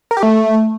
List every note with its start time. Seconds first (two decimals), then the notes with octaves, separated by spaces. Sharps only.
0.11 A#4
0.17 G4
0.23 A3